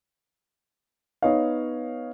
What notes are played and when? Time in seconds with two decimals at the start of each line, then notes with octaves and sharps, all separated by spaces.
1.22 B3 D#4 C#5 F5